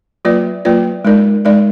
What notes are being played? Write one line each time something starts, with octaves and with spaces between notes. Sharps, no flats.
F#3 A#3 F4 B4 D5
F#3 A#3 F4 B4 D5
G#3 D#4 A#4 D5
G#3 D#4 A#4 D5